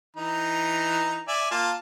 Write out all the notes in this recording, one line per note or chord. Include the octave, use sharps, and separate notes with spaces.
E3 D#4 A#5
D5 E5 G#5
A#3 F4 A5